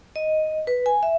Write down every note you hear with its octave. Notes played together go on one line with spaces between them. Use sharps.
D#5
B4
G#5
E5